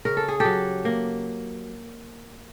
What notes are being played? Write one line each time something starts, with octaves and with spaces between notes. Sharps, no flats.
C#3 A#4
A4
G#4
G4 A4
F#3
A#3